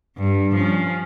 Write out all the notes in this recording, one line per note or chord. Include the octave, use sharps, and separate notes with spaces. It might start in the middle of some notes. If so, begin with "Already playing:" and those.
G2
F3 C#4